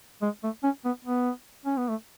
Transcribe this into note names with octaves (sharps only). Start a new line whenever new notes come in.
G#3
A3
C#4
B3
B3
C#4
B3
A3